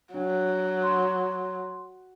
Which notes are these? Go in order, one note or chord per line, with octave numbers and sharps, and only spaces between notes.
F#3 D4
C6